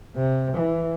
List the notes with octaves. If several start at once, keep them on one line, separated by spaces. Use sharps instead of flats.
C3
E3